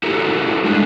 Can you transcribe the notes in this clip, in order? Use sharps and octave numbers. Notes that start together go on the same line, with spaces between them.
E4 F#4 G4 A4 A#4
G3 G#3 D4